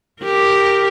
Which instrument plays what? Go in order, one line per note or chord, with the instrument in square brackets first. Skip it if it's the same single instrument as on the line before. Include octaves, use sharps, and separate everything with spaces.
[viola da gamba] G4 A#4